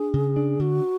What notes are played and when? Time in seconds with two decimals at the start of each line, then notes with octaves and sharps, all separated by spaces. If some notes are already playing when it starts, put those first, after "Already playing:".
Already playing: D4 G#4
0.14 C#3
0.36 D4
0.59 D3 F#4